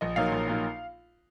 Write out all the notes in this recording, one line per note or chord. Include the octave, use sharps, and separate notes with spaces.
A#1 D#5
A#2 F#3 A#3 D#4 F5
A#1
A#2 F#3 A#3 D#4